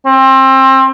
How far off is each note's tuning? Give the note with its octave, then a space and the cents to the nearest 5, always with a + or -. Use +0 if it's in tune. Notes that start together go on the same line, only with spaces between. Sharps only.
C4 +25